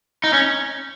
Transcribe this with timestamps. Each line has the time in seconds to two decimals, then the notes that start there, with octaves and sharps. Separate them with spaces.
0.24 D#4
0.33 C#4